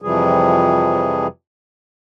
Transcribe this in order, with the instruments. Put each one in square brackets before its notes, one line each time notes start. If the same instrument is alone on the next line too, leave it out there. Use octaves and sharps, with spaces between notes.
[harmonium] F2 C3 E3 F3 G3 G#4